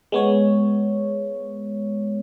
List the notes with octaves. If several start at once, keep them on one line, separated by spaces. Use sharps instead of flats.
G#3 B3 C#5